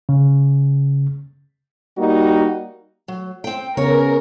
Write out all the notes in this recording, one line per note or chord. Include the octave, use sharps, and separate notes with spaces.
C#3
G3 A#3 D#4 F#4
F#3
C4 G5
C#3 B3 C#4 A#4 C#5